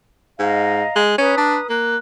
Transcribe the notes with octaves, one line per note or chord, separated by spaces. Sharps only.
G#2 D#5 F5 A#5
G#3
C#4 B4 A#5 D#6
D4
A#3 F#6